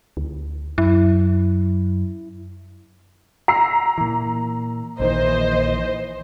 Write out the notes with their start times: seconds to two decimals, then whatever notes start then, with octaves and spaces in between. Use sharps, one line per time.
0.17 D2
0.78 F#2 E4
3.48 A#5 E6 C7
3.98 A#2 E3
5.00 A#1 A#2 D#3 E3 C5 D#5